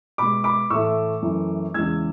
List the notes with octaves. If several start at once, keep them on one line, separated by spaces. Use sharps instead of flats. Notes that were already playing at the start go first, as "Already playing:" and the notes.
B2 G#3 B5 D6
B5 D6
A2 E3 A3 C#6 E6
F#2 E3 A3
E2 C#3 E3 G#3 E6 G#6